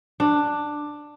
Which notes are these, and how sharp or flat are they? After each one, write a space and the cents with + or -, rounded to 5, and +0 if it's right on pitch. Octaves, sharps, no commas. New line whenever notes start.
D4 +10